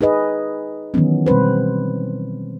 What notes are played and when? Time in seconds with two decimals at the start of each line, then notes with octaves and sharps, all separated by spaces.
0.01 D#4 G#4 B4 D#5
0.94 D#3 E3 F#3 B3 C#4
1.26 B2 G3 C4 B4 C5